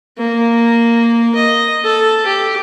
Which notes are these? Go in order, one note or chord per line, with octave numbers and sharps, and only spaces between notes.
A#3
D#5
A4
G4